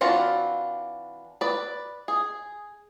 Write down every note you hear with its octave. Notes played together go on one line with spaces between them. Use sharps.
E3 C4 D4 F4 F#4
B4 D5
G#4